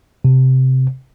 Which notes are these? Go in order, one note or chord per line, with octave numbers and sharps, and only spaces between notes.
C3